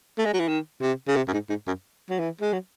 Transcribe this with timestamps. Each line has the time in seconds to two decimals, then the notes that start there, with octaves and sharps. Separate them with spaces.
0.18 A3
0.25 G#3
0.33 F#3
0.40 E3
0.48 D#3
0.81 C3
1.08 C#3
1.16 C3
1.28 F#2
1.33 G#2
1.50 G#2
1.67 F#2
2.10 F#3
2.19 E3
2.41 G#3
2.53 F#3